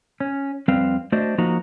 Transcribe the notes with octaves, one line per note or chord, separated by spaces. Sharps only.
C#4
F2 G3 C4 B4 F5
A3 D4 F#4 C5 D5 D#5
F3 A#3 D#4 F#4 A#5